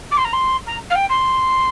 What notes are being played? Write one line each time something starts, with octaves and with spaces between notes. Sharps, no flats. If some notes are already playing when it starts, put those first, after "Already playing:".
D6
C6
A#5
C6
A#5
F5
G5
C6